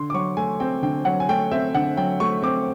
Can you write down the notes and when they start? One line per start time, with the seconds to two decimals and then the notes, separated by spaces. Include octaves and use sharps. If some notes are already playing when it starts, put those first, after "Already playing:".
Already playing: D3 C6
0.10 D6
0.14 F#3 C#6
0.37 A3 G#5
0.60 C4 G5
0.83 D3 G5
1.05 F#3 F#5
1.20 G#5
1.29 A3 G5
1.51 C4 E5
1.74 D3 F#5
1.97 F#3 G5
2.20 A3 C#6
2.42 C4 D6